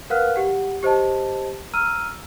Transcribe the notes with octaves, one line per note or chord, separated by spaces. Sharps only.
A#4 B4 F5 F#5 F6 F#6
G4 F#5
G4 C5 D#5 A5
A#5 E6 F6 D#7